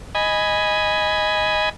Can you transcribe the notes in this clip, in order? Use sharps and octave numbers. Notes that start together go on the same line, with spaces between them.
D#5 G#5 B5